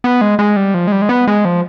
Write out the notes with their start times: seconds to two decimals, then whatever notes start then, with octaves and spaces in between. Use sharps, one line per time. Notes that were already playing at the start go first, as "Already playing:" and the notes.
0.04 B3
0.21 G#3
0.39 G#3
0.56 G3
0.74 F3
0.87 G#3
0.92 G3
1.02 G#3
1.09 B3
1.27 G#3
1.45 F3